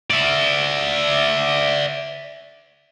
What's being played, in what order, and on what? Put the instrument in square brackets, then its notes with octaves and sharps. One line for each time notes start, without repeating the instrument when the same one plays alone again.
[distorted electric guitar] D5 E5